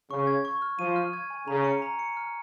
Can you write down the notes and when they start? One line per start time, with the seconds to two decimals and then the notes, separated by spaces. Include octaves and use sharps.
0.10 C#3 C#6
0.27 G#6
0.45 C#6
0.62 F6
0.79 F3 D#7
0.96 F6
1.13 G#6
1.30 G#5
1.47 C#3 A#5
1.64 C#7
1.82 A#5
1.99 C#7
2.17 F6